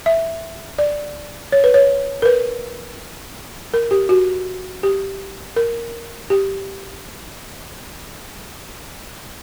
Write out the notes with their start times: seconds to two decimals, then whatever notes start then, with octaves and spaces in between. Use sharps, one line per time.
0.06 E5
0.79 D5
1.52 C#5
1.64 B4
1.74 C#5
2.22 A#4
2.25 B4
3.74 A#4
3.91 G4
4.09 F#4
4.83 G4
5.56 A#4
6.30 G4